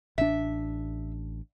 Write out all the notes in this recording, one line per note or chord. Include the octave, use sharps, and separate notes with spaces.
A1 D4 E5